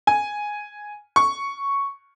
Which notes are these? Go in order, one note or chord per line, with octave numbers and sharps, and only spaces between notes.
G#5
C#6